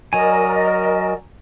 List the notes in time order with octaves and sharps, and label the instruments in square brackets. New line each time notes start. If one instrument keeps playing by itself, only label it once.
[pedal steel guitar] F#3 G#5 [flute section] A#4 D5 D#5